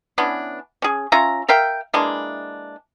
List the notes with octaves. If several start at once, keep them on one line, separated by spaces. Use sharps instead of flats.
E3 B3 C#4 D4
C#4 G#4
C#4 F4 E5 A#5
A#4 E5 F5 G5
E3 G#3 A#3 D4